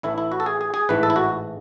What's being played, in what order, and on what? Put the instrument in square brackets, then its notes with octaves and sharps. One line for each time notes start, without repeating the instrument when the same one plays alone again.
[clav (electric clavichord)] A1 A2 E3 A3 E4
E4
F#4
A4
G#4
G#4
G#4
A1 G#2 E3 A3 B4
A4
E4
F#4